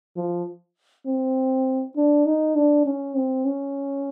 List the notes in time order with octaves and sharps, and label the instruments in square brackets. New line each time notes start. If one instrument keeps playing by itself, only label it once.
[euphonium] F3
C4
D4
D#4
D4
C#4
C4
C#4